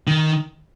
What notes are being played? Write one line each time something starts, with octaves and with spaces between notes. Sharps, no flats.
D#3